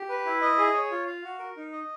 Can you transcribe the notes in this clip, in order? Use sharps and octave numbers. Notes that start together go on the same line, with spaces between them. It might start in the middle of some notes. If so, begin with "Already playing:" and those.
Already playing: G4
B4
E4
D#5
G#4
C#5
F4
F5
F#4
A#4
D#4
D#5